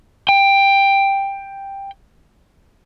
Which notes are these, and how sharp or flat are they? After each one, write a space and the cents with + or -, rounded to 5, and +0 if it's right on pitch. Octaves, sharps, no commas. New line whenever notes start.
G5 +10